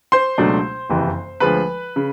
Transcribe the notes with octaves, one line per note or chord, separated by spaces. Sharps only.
C5 C6
C#2 B2 F#3 A3 D4
F#1 F2 C3 E3
D2 D3 F3 G#3 B4 B5
C#3